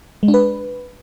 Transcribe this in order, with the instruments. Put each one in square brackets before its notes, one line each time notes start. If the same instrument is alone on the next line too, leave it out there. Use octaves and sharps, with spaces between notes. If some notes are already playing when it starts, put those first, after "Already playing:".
[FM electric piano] G#3
D4
B4